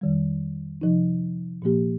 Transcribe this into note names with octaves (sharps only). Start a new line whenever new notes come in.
F2 D#3 G3
C3 F3 D#4
A#2 F3 A#3 G4